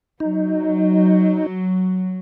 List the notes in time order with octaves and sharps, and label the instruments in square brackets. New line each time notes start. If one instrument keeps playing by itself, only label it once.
[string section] F#3 [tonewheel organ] D#4